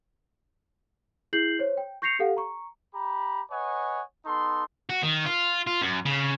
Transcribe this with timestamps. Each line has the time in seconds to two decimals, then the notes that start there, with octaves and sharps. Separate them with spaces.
1.33 E4 G#4 G6 C7 F#7
1.59 C5 C#5
1.77 G5
2.02 C#6 G6 A#6 C7 C#7 F7
2.19 G4 A4 F5 F#5
2.37 A#5 C#6
2.95 G4 A#5 B5
3.51 B4 C#5 D#5 F#5 G#5
4.26 B3 D#4 A4 C6
4.89 F#4
5.03 D#3
5.26 F4
5.67 F4
5.82 F#2
6.05 C#3